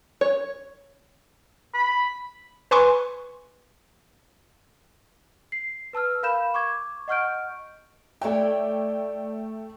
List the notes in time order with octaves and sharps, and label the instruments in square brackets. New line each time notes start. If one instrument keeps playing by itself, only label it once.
[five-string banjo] C#5
[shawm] B5
[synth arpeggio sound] B4 G#5 C6 C#6
[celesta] C7
B4 A5 E6 F6
A#4 F5 B5 G6 E7
C#6 D6 G#6
D#5 F#5 C#6 F6 G6 D7
[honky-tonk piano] A3 G5 [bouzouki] E4 C#5 D5